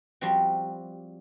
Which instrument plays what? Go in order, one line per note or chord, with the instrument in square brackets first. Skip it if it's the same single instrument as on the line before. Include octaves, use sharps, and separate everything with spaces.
[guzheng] F3 G3 C4 F#4